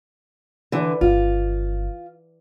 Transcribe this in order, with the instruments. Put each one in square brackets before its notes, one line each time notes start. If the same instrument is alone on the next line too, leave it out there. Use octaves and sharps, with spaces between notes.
[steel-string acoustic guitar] D3 E3
[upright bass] G1 D#3 [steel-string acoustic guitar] F4